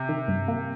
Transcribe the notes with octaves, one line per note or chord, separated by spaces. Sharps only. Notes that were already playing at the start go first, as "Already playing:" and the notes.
Already playing: C3
D#3
G2
A#3